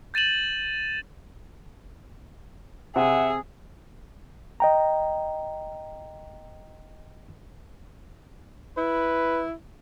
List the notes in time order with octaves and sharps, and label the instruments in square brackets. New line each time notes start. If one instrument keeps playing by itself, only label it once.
[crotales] G6 A6 D#7 E7 F#7
[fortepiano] C3 [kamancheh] G#4 [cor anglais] E5 [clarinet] F#5
[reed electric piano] D#5 G5 A#5
[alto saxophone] E4 [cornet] B4